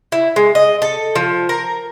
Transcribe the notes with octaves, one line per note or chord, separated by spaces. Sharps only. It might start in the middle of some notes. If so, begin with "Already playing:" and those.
E4
G#3
D#5
A4
F3
A#4